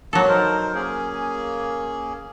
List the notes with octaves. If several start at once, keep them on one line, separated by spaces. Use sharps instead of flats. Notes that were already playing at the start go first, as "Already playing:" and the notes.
F#3 A#3 A4
D#4 A#4 C5
A#3 C#4 G#4